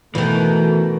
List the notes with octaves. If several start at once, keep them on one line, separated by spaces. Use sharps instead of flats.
B2 D#3 E3 A3